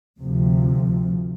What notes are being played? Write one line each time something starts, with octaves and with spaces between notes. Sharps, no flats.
D2 C3 F3